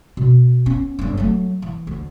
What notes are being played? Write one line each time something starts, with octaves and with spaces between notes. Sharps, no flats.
B2
B3 C#4
G1 D4
F#3 A3
E3
D2